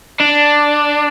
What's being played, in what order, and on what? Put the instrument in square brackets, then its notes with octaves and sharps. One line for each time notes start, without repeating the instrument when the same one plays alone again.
[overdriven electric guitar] D4